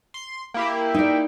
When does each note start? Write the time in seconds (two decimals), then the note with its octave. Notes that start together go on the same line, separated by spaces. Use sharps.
0.14 C6
0.54 A#3 E4 G4
0.94 D#4 D5